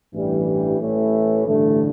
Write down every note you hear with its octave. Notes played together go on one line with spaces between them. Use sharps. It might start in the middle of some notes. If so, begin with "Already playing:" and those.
A1 G2 E3 G3
G3
A1 A2 E3 A3
A1 G2 D3 A3